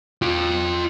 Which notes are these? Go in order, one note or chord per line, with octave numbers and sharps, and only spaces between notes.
F4 G5